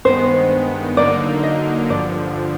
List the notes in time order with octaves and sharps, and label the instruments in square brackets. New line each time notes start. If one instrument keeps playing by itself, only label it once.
[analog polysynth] G2 D#3 G#3 B3 [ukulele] C5
[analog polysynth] D3 F#3 A#3 D#4 [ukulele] D5
[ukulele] D#5
[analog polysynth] G2 D3 F3 [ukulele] D5